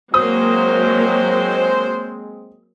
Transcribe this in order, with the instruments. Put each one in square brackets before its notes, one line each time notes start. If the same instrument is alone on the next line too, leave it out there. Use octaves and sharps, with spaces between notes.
[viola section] F#3 A#3 [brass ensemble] G#3 C4 [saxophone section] C5 [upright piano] D#6